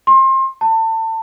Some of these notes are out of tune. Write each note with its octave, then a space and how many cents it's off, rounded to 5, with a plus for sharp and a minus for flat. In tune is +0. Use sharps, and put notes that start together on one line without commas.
C6 +30
A5 +30